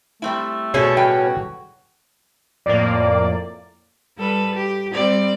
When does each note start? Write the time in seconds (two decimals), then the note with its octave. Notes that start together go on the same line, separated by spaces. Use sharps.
0.22 G3 A3 C4 E4
0.74 B2 C#4 G#4 A4
0.97 A2 G3 F#4 G5
2.66 F2 A2 A#3 D5
4.17 G3 A4 B4
4.56 G4
4.93 G3 C4 D5